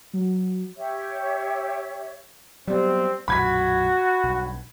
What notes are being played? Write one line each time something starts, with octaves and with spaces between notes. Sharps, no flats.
F#3
G4 C#5 E5
F#3 G3 B3 C4
B1 F#2 A#2 F#4 B5 G#6 B6
B1 G2